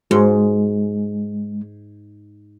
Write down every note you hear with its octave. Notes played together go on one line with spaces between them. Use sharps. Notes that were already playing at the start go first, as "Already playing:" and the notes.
G#2 G#3 F#4 G#4